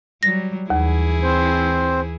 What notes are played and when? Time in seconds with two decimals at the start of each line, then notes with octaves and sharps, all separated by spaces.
0.23 F#3 G3 A#6
0.70 D#2 E3 E4 G#4
1.23 C4 C5